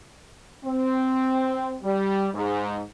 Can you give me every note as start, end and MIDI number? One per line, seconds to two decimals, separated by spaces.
0.65 1.75 60
1.83 2.28 55
2.34 2.82 44